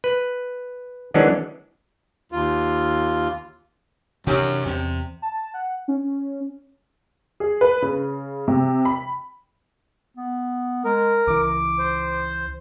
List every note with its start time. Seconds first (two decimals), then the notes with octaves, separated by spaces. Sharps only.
0.04 B4
1.14 D#3 E3 F#3 G#3 C#4 D4
2.32 D#2 F4
4.27 F#2 C3 E3 C#4 D4 G4
4.66 E2 C3
5.22 A5
5.54 F#5
5.88 C#4
7.40 G#4
7.61 B4
7.82 C#3
8.48 C3
8.85 B5
10.17 B3
10.85 G#3 A#4
11.27 C#2 E3 D6
11.79 C5